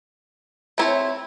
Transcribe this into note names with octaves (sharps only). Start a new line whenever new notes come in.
A3 C4 E4 G#4 C#5